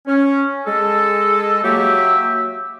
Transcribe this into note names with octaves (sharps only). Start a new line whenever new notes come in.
C#4
G#3 A4
F#3 A#3 G4 E5